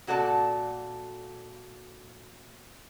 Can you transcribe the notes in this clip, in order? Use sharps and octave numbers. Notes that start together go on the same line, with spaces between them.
A#2 F#4 A4 D5 A5